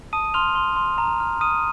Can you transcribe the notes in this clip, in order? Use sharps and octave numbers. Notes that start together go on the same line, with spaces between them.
A5 D#6 D#7
C6 F6 F7
C6
C6
A#5
F6
D#6 F6 D#7